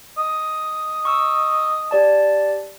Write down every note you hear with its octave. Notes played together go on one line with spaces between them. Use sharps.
D#5
C#6 E6
G4 D5 A5